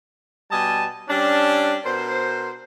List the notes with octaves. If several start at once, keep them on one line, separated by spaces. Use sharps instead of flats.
B2 G3 D#5 G#5 A5
G3 C#4 D4
B2 A#4 C5